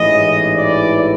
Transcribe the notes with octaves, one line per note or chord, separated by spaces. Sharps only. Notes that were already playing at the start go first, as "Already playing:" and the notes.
Already playing: A1 G#2 E3 D#5
D5